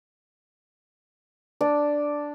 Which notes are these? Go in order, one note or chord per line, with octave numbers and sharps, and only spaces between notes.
D4